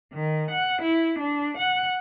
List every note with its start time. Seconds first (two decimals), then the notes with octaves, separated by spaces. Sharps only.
0.13 D#3
0.50 F#5
0.82 E4
1.19 D4
1.57 F#5